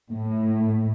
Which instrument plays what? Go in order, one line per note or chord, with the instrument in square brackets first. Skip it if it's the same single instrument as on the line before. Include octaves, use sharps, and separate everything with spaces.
[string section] A2